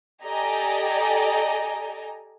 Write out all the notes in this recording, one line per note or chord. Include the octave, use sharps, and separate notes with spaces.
G4 A4 D5 D#5 G#5 A#5